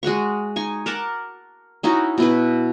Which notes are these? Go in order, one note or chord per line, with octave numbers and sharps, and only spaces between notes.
G#3 F#4 F#5 C#6
D#4 G#5 C#6
A#4 F#5 A5 D6
C#4 D#4 E4 F#4
B2 E4 B4